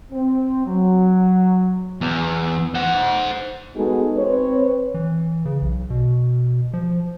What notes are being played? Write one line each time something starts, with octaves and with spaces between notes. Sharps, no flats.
C4
F#3
E2
C5 F#5
G#3 B3 D#4 F#4 G#4 A4
C4 B4 C#5
E3
C#3
B1
B2
F3